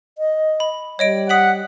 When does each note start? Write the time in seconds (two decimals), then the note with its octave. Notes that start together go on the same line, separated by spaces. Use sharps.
0.18 D#5
0.60 B5
0.99 G3 C#5 D#5 D7
1.29 F#5 D#6 B6 F#7